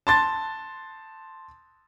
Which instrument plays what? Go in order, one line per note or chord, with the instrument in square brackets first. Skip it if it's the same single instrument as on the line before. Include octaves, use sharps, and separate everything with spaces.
[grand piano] A5 C6 A6